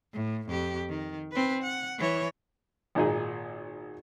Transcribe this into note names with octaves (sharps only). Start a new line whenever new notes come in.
A2
F2 G4
D#3
C4 B4
F#5
E3 C#5
G#1 A#2 D#4 G#4